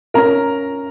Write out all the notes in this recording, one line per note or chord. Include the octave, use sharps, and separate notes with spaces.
C#4 A#4 A#5